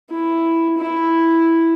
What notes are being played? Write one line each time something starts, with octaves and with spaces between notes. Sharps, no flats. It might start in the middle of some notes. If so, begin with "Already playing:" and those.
E4
E4